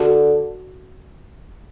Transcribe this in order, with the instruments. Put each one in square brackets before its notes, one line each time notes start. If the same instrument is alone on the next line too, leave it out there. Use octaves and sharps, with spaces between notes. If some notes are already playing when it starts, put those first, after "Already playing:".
Already playing: [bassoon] D3 [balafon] F#4